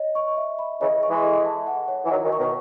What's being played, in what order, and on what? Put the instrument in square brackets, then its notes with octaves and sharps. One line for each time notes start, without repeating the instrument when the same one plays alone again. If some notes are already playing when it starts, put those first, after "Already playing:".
Already playing: [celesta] C#5 D#5
C#6
E5
B5
[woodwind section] C#3 E3 [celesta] D#5
[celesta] C#6
[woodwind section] E3 G#3
[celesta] A4
A5
F#5
C#5
[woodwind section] E3
[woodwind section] D#3 F#3 [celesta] C#5
[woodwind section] D#3 F#3
[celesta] C#6
[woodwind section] B2 D#3